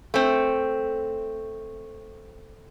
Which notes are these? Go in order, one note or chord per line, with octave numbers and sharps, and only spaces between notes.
A3 C4